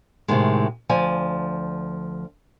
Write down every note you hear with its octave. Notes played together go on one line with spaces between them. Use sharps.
A2 C3 D#3 G#3
D2 F3 D5 G#5